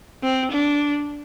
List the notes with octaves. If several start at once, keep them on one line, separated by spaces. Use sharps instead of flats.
C4
D4